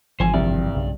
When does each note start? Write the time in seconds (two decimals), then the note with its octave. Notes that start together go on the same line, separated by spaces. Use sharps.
0.20 G#1 C#3 E3 F3 C5 G#5
0.34 C2 G2 D5
0.75 B1 C#3